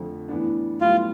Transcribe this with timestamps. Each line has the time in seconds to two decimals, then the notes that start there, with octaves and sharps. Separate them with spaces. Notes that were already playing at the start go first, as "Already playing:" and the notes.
Already playing: F2 D3 F3 A3
0.28 A2 E3 B3 D4
0.80 B1 A2 G3 B3 F4